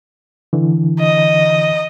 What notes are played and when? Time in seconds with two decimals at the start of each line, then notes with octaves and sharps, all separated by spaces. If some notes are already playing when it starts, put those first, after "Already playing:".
0.53 D3 E3
1.00 D#5